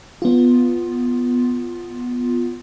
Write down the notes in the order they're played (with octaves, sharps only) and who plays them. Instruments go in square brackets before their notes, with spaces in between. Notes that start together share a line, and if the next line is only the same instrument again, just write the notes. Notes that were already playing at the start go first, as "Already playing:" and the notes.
[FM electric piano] B3 F4